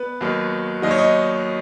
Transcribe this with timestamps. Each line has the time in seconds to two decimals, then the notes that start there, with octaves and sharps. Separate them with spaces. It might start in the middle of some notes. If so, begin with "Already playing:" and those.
Already playing: B3 B4
0.21 D#2 D#3 F#3
0.82 D#2 D#3 F#3 D#5
0.91 C#5
0.98 D#4 D#5